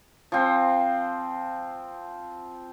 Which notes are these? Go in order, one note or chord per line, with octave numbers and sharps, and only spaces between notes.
F3 C4